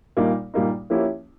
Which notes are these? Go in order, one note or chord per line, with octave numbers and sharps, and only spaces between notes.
A#2 G3 A#3 D#4
A#2 G3 A#3 D#4
F3 A#3 C#4 E4 G4